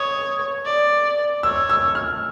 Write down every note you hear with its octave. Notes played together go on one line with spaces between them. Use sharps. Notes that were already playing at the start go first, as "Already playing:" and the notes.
Already playing: C#5 D#6
D5
C#5 E6
E6
F6